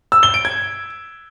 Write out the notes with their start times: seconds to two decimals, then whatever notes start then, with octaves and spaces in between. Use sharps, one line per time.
0.12 E6
0.23 G7
0.34 D7
0.45 G#6